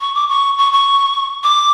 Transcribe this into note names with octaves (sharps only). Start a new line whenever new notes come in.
C#6
D6
C#6
C#6
C#6
D6